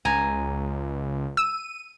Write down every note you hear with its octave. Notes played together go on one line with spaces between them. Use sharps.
C#2 G#5 A#5
E6 D#7